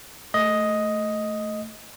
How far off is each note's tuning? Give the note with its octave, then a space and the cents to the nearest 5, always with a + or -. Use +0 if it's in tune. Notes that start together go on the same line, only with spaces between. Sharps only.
A3 +0 D#5 +5